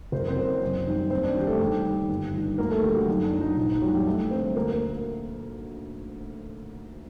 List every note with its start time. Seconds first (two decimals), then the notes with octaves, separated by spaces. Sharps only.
0.12 F#1 C5
0.20 A#4
0.28 C4 C5
0.36 F#2 F#3
0.61 F#2
0.87 D#3 G3
1.10 D#2 C4 C5
1.23 D4 D5
1.35 D#3 G3 G4
1.47 A3 A4
1.60 D#2 G3 G4
1.84 D#3 G3
2.09 G1
2.34 G2 D#3 G3
2.58 D2 A#3 A#4
2.71 A3 A4
2.83 D3 F#3 G3 G4
2.96 F#3 F#4
3.08 F#2 D#4
3.24 D4
3.33 F#3
3.41 D#4
3.57 A#1 D#4
3.70 D#4
3.82 A#2 F#3 G3 F#4
3.94 G3 G4
4.06 D#2 A3 A4
4.31 D3 G3 C4 C5
4.56 D2 A#3 A#4
4.72 A#3 A#4